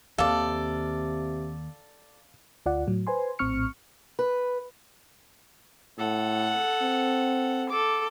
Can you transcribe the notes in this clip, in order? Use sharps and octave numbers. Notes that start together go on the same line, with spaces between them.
D#2 C3 A4 D5 F5
D2 F4 D5 F#5
A2 F#3
B4 C5 G#5 C6
A#1 A2 C4 C#6 F6 C#7
B4
A2 A4 F#5
C4
A4 D6